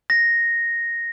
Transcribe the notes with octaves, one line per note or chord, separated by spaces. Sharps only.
A#6